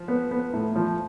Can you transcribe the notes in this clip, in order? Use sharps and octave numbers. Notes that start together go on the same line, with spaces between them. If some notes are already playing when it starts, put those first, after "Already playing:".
Already playing: F3
B3
B3
A2
F3